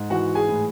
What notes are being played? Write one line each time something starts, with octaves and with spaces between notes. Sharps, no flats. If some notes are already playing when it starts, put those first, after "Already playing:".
Already playing: G#2
E3 F#4 F#5
G#4 G#5
A2